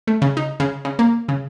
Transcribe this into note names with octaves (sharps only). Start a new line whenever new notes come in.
A3
C#3
D#4
C#3
C#3
A#3
C#3